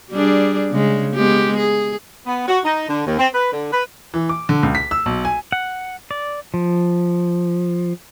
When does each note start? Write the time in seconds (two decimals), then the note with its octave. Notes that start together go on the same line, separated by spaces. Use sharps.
0.11 G3 D4 G#4
0.72 C#3 G#3
1.15 G#3 B3 G4
1.57 G#4
2.26 B3
2.48 F#4
2.64 D#4
2.89 D3
3.06 D#2
3.19 C4
3.33 B4
3.53 D3
3.72 B4
4.14 E3
4.29 D6
4.49 D3
4.63 C#2
4.75 B6
4.91 E6
5.06 B1
5.25 G#5
5.52 F#5
6.11 D5
6.54 F3